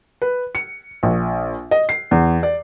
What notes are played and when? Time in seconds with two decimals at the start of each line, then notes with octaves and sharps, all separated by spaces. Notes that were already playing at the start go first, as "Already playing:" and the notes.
0.22 B4
0.55 C#7
1.03 A#1
1.71 D#5
1.89 C7
2.11 E2
2.43 D5